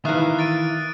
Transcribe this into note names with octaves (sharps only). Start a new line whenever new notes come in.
D#3 E3 E5 F5 A#5 D#6 F#6
A6 D7 D#7